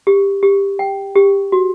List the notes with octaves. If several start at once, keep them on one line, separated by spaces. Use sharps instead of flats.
G4
G4
G5
G4
F#4